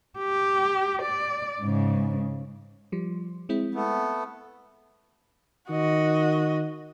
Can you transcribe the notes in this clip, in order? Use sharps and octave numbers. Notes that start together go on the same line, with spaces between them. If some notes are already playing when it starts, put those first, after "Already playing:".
G4
D5
G#2 C#3
F3 G3
G#3 C4 E4
A3 B3
D#3 F#4 D#5